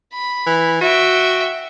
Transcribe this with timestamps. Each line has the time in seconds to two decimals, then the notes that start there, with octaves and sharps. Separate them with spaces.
0.14 B5
0.46 E3
0.81 F#4 E5 G5